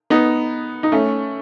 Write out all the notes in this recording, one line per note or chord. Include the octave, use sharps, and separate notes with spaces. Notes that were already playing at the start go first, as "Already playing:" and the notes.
B3 D#4
D#4
A3 C#4